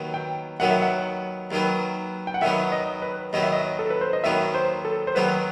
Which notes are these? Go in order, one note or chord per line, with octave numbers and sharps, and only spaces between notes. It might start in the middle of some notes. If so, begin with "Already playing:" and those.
Already playing: D#2 D#3 F#3 B3
G5
D#2 D#3 F#3 B3 F#5
E5
F#5
D#2 D#3 F#3 B3
G5
F#5
D#2 D#3 F#3 B3 E5
D#5
B4
D#2 D#3 F#3 B3 D#5
E5
D#5
A4
B4
C5
D#5
D#2 D#3 F#3 B3 E5
C5
A4
C5
D#2 D#3 F#3 B3 B4